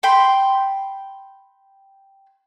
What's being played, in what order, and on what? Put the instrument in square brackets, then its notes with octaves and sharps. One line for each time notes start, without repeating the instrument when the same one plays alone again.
[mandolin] G5 B5 C6